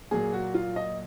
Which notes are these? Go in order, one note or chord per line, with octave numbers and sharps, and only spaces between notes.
A#2 F#3 A#3 G#4
F#4
F4
D#5